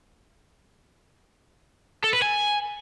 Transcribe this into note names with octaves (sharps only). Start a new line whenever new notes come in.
A4
B4
G#5